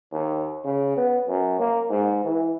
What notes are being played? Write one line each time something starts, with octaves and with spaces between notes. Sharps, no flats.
D#2
C#3
B3
F#2
A#3
G#2
E3